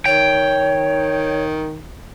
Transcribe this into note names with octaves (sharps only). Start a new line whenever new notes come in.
D#3 C#5 G5